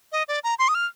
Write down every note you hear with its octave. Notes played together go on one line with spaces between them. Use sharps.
D#5
D5
A#5
C6
D#6
F6